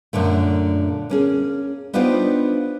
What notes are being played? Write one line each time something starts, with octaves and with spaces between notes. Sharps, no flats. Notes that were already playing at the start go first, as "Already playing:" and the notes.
F#2 A#2 D3 A3
A#3 C#4 G#4
B3 D4 D#4 F4 G4 C5